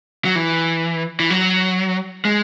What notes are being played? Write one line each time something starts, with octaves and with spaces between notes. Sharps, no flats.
F#3
E3
E3
F#3
G#3